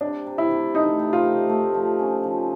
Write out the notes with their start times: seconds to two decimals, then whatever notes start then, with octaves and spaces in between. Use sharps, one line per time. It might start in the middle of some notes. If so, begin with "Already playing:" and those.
0.01 C3 D4
0.27 C3
0.38 E4
0.51 C3
0.75 A3 D#4
0.99 C3
1.13 F4
1.25 A3
1.49 A3
1.74 F3
1.99 C#4
2.24 F3